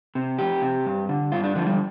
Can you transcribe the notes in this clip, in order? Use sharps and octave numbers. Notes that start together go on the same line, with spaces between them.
C3
F2 G4
C3
G2
D3
G2 F4
D4
D3 F3
G3